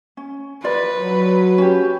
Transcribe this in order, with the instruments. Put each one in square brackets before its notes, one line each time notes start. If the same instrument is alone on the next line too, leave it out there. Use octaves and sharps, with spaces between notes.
[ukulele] C#4
[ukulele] F4 A#4 D5 [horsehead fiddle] B4
[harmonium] F#3
[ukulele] C#4 G4